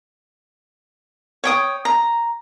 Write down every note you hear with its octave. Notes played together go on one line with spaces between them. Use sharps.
C#5 G5 D#6
A#5